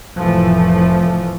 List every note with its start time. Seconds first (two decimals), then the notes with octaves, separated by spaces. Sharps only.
0.18 F1 A2 E3 F3 A3